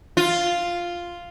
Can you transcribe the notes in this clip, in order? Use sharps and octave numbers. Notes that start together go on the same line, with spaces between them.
F4